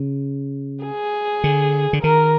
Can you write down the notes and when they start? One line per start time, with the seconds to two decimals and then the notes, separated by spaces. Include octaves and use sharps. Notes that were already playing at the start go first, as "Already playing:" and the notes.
Already playing: C#3
0.84 G#4
1.44 D3
1.93 D3
2.03 D#3 A#4